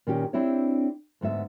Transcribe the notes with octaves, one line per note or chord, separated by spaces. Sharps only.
A#2 D#3 C#4 G4
C4 D4 E4 G4 C#5
D2 G#2 B3 E5